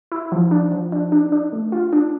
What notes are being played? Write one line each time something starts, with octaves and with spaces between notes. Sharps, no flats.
E4
F3
D4
F3
D4
D4
D4
A3
F4
D4